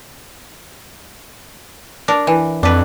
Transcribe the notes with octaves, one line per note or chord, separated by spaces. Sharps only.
D4 A#4
E3
F2 D4 B4